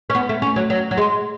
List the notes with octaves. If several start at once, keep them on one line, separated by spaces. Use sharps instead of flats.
C#4
B3
A3
C#4
F#3
F#3
F#3
G#3